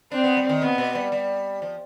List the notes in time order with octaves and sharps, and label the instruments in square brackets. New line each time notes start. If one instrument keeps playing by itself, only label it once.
[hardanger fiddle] C4 [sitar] D4
[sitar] B3
G3
D#3
[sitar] C3 [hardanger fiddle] B3
[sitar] B2
G3
G3
F3